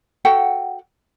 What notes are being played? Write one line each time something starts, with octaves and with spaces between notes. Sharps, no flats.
F#4 A4 F#5 G5